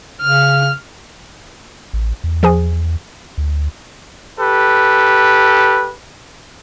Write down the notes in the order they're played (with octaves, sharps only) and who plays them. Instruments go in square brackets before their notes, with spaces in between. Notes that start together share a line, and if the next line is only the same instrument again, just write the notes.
[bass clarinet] C#3 [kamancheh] F6
[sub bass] A1
E2
[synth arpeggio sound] F3 G#4 G#5
[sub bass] D2
[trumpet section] G4 A4 B4